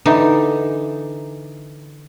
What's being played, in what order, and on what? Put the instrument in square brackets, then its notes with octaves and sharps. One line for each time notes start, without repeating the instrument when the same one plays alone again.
[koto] D3 E3 D#4